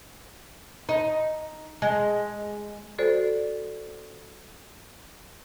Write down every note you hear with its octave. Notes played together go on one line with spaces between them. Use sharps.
D#4
G#3
F#4 A4 C5 D5